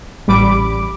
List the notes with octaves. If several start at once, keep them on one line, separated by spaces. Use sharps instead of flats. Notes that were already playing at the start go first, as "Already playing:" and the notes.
A1 G3 B5 D6 D7